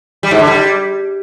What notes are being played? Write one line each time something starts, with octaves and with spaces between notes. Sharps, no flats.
G3
G#2
D3
G3